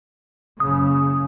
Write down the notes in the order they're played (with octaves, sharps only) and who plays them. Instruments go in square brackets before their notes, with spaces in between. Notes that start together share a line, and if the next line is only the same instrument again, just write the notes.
[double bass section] F#1 C#3 [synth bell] D#6